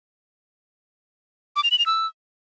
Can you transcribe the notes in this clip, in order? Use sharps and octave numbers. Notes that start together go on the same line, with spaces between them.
D6
F7
F#7
F7
E6